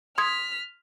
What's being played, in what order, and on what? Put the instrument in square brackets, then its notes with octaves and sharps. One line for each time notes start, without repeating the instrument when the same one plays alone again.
[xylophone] C6 D#6 G#6 [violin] F6 B6